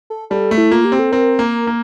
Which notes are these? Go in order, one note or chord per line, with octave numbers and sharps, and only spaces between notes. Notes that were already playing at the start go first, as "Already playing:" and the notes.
A4
G3 A4
A3
E4
A#3 F4
G4
C4
A4
C4 A#4
A#3
A#3